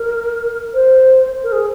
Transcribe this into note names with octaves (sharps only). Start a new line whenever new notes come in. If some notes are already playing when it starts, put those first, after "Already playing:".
Already playing: A#4
C5
A#4
G#4